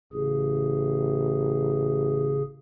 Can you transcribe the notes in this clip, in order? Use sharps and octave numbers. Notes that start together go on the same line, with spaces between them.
A1 C#3 G#4